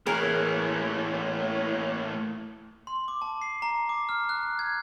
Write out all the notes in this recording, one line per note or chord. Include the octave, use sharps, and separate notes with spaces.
A2 E3 A#3 G#4 A#4 C#5
C6
D6
A5
C7
A#5
D6
F6
F#6
G#6